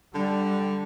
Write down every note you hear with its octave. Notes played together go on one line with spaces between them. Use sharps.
D3 G3